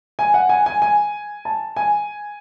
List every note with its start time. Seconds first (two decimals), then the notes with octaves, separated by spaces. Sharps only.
0.19 G#5
0.34 F#5
0.49 G#5
0.66 G#5
0.82 G#5
1.45 A5
1.76 G#5